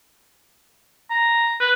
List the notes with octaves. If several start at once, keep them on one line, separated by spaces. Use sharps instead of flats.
A#5
B4